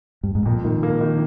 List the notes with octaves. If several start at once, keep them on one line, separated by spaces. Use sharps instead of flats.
G2
G#2
F2 A#2
D#3
A#3
D#3